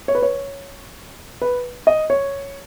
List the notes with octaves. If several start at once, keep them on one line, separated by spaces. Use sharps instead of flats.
C#5
B4
C#5
B4
D#5
C#5